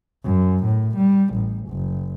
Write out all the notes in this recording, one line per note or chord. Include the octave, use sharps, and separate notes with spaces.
F#2
A2
G3
A1
F#1